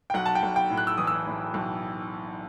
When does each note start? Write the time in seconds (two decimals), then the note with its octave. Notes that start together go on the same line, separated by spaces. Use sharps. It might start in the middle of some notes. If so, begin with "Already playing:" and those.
0.10 G5
0.14 B1 F#5
0.26 A5
0.35 G5
0.43 B1
0.56 G5
0.70 A2
0.77 F#6
0.87 E6
0.98 E3 D#6
1.07 E6
1.27 A2
1.54 B1